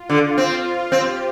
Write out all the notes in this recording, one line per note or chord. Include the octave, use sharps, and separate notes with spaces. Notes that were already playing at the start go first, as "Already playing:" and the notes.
Already playing: F4
D3
C4 F4
C4 G4